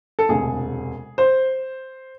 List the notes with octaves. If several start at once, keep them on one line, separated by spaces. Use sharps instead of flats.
A4
E1 D2 C3 G#4
C5